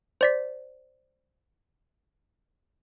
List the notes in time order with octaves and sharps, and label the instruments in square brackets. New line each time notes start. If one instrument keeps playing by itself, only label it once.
[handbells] C5 D5 B6